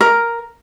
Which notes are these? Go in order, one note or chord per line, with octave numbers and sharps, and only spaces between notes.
A#4